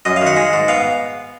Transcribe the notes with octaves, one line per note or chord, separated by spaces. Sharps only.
F#2 D#5
F5
D#3
F#5
G#3
G#2
B3 F5